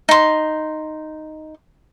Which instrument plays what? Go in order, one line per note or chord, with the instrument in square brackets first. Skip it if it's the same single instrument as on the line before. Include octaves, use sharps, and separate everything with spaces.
[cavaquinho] D#4 C6